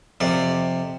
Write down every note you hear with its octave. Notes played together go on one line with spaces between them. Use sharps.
F2 C3 D5